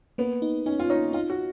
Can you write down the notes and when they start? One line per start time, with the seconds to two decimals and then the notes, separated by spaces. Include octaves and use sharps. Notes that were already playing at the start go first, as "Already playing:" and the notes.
0.18 A#3 B3
0.42 D#4
0.66 C#4 D#4
0.80 F4
0.90 D#4 C#5
1.13 D#4 F4
1.30 F#4